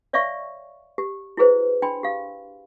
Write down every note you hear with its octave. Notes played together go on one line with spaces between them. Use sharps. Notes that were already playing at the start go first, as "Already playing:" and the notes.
C#5 D5 E5 F5 C#6
G4
E4 F#4 G#4 B4 C5
D4 G5 B5 C6
G4 F5